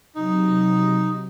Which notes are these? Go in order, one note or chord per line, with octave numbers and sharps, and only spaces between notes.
C3 F#3 D#4